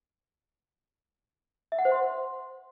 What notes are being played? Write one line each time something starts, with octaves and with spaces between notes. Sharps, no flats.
E5
F#5
C5
C6